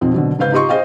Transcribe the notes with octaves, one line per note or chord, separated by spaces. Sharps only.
B1 F2 C4
B2 D3 F#3
G#2 C#3 B4 F5 G6
D#4 F4 G4 D#5 C6 C#6
G#4 C5 D#5 F5 G5